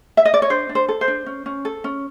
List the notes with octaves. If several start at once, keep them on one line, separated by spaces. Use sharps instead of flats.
E5
D#5
D5
C#5
D4 C5
D4
C5
A4
C5
D4
C#4
C#4
A4
C#4